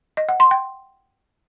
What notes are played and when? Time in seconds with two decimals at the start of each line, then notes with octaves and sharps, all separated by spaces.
0.17 D#5
0.29 F#5
0.40 C6
0.51 G5